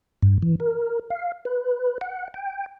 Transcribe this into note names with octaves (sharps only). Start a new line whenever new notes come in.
G2
E3
A#4
F5
B4
F#5
G5